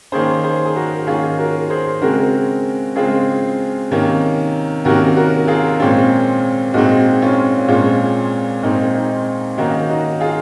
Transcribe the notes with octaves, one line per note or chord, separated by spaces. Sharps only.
D#3 A#3 C#4 G#4 C5
G#4 C5
G#4
F#4 A#4
D#3 A#3 C#4 F4 G#4
F#4 A#4
G#4 C5
C#3 G#3 C4 F#4 A#4
C#3 G#3 C4 F4 G#4
C3 D#3 A#3 C#4
C3 D#3 A#3 C#4 F#4 A#4
F#4 A#4
F4 G#4
A#2 G#3 C4 C#4 F4
A#2 G#3 C4 D#4 F#4
C#4 F4
A#2 G#3 C4 C#4 F4
A#2 G#3 C4 D#4
D#4
D#3 A#3 C#4 D#4 F#4
D#4 F#4
F4 G#4